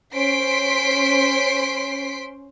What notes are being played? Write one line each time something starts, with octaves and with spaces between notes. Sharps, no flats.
C#4 C5 C6 B6 C7 D7